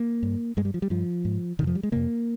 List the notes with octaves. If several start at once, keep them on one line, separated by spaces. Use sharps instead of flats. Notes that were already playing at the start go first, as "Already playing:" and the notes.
Already playing: A#3
G2
G2 G#3
G3
F3
G3
G2 F3
G#2
F2 C3 D#3 F3
G3
G#3
F2 C3 A#3